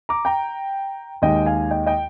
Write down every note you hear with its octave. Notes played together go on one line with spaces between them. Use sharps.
A#5 D6
G5 A#5
D#2 D#3 G#3 D#5 G5
F5 G#5
D#5 G5
D#5 G5